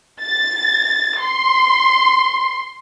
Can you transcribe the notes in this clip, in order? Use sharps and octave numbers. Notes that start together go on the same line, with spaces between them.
A6
C6